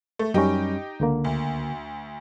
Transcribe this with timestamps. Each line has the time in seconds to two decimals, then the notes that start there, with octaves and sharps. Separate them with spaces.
0.19 A3
0.34 F#2 G3 C#4 D#4 G4
1.00 C#2 D3 A#3
1.24 D2